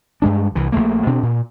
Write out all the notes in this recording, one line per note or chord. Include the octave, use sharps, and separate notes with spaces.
G2 G#3 D4
C2 E3
A#1 A3 A#3
B2 C4 D4
A#2